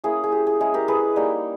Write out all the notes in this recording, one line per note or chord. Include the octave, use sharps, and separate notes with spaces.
A#3 C#4 E4 G#4
G#4
G4
G#4
G#3 C#4 E4 G#4
G4 A#4
G#4 B4
G3 A#3 D#4